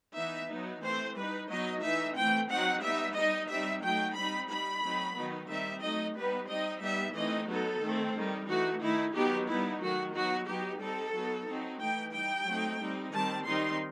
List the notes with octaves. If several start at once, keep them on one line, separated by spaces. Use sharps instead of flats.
E3 B3 D#4 E5
F#3 B3 D#4
E3 A3 C4 C5
G3 D#4 B4
F#3 B3 D#4 D#5
E3 A3 D#4 E5
E3 A3 C4 G5
F#3 C4 D#4 F#5
G3 B3 D#4 E5
G3 D#4 D#5
G3 C4 D#4 E5
F#3 A3 D#4 G5
G3 C4 D#4 B5
G3 D#4 B5
F#3 A3 C4 D#4
D#3 F#3 B3 D#4
D#3 G3 C4 D#4 E5
F#3 A3 D#4 D#5
G3 B3 D#4 B4
G3 C4 D#4 D#5
G3 B3 D#4 E5
E3 A3 C4 D#4 D#5
F#3 B3 D#4 A4
D#3 A3 C4
D#3 G3 D#4
E3 A3 D#4 F#4
D#3 A3 D#4 E4
D#3 F#3 B3 D#4 G4
G3 B3 D#4 E4
D#3 F#3 A3 F#4
F#3 B3 D#4 F#4
F#3 B3 D#4 G4
G3 C4 D#4 A4
F#3 B3 D#4
F#3 C4 D#4
E3 A3 D#4 G5
G3 D#4 G5
F#3 A3 C4 D#4
G3 C4 D#4
D#3 G3 C4 A5
D#3 G3 C4 D#4 C6